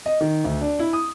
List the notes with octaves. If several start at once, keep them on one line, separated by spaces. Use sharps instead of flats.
D#5
D#3
D2
D4
E4
D#6